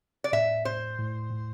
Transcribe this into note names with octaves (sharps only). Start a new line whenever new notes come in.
D5
A2 E5
A2 C5
A2
A2